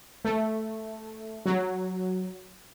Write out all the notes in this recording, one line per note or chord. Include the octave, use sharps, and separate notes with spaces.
A3
F#3